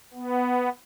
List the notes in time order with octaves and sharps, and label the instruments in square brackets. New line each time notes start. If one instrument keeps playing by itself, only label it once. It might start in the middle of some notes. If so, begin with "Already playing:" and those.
[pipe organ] B3